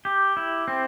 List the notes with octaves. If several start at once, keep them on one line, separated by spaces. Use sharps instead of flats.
G4
E4
C4